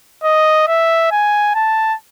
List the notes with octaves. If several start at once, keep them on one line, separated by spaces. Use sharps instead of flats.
D#5
E5
G#5
A5